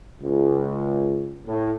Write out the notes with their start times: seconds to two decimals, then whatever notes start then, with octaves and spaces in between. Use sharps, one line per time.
0.21 C#2
1.46 A2